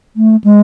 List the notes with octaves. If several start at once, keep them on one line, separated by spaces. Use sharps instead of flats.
A3
G#3